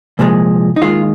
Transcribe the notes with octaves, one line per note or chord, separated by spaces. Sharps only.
C2 A#2 F3 G#3
D#4
D#2 D#3 G#3 F4